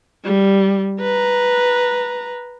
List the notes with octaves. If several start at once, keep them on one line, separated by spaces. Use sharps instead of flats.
G3
B4 A#5